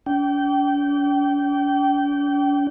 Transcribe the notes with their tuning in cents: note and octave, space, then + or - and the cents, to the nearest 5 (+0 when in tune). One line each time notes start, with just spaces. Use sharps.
D4 -45 G5 -25